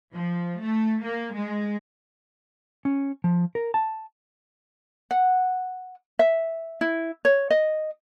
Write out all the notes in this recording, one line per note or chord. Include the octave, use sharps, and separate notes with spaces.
F3
A3
A#3
G#3
C#4
F3
A#4
A5
F#5
E5
E4
C#5
D#5